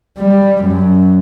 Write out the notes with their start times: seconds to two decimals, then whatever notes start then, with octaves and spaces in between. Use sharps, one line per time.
0.18 G3
0.65 F#2